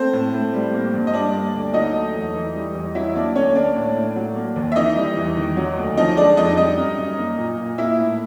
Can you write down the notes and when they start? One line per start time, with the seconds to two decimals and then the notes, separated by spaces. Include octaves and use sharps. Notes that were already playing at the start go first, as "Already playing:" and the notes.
Already playing: A3 C4 C5
0.13 A2
0.34 A2
0.54 G3
0.74 A#3
0.94 G2
1.07 D#5
1.14 G3 D4 D5
1.34 A#3
1.54 D2
1.74 F#3 D#4 D#5
1.94 A3
2.15 E2
2.35 E3
2.55 G3
2.75 E2
2.95 F#3 E4 E5
3.15 A#3 D4 D5
3.36 D2 C#4 C#5
3.55 A#3 D4 D5
3.76 A2
3.96 A2
4.16 F#3
4.36 A#3
4.56 D#2
4.72 E5
4.76 E3 D#4 D#5
4.96 G3
5.17 E2
5.37 D#3
5.57 F#3
5.77 D2
5.97 F3 D#4 D#5
6.17 G#3 D4 D5
6.37 F2 D#4 D#5
6.57 G3 D#4 D#5
6.77 F#2
6.98 F#2
7.18 A#3
7.38 A#2
7.58 A#2
7.78 A#3 E4 E5
7.98 A2